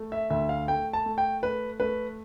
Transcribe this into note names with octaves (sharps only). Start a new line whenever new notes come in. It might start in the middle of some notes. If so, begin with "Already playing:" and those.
Already playing: A3
E5
D2 E5
F5
A3 G5
A5
A3
G5
A3 B4
A3 B4